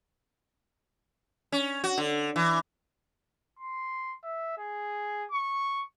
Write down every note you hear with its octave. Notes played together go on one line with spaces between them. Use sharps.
C#4
F#4
D3
E3
C6
E5
G#4
C#6